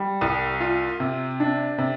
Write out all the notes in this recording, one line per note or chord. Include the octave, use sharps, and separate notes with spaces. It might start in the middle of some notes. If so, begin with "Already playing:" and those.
Already playing: G3
C2
F4
C3
D4
C3